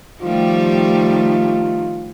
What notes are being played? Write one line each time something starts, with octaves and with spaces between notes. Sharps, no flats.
D#3 F3 G3 A3 F4 G4